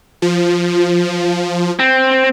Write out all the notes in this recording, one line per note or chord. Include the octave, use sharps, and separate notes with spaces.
F3
C4